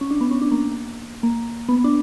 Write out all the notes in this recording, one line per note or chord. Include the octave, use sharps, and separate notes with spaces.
C#4
D4
B3
C#4
D4
A#3
A#3
B3
D4